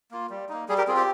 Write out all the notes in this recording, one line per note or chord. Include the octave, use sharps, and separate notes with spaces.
A#3 F4
G3
A#3 D#4
G3 G#4
G4 A#4
C4 F4 G#4
G4